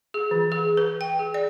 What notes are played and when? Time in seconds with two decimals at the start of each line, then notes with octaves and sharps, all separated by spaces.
0.14 G#4
0.31 E3
0.52 G#4
0.77 B4
1.01 G5
1.19 G#4
1.34 D5